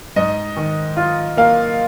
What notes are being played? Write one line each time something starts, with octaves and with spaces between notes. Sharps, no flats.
G#2 D#5
D#3
F4
A#3 F5